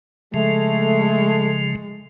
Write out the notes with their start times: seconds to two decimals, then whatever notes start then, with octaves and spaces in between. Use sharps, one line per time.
0.34 C#3 F3 G#3 A3